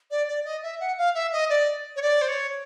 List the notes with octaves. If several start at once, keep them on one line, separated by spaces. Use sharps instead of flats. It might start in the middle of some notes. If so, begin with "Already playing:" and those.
D5
D5
D#5
E5
F#5
F5
E5
D#5
D5
C#5
D5
C5
C#5